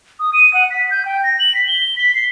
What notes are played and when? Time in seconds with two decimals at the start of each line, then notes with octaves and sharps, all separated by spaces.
0.20 D#6
0.33 D#7
0.54 F#5
0.71 B6
0.91 G6
1.05 G5
1.24 A#6
1.39 F#7
1.55 B6
1.68 G7
1.96 B6
2.15 C7